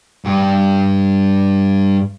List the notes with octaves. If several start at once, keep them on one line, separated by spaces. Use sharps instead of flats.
G2 G4